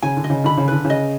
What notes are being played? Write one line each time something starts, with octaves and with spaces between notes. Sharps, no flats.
C#3 G#5
D3
D#5
C#3
D3 B5
C#3
D3 B4
C#3
D#5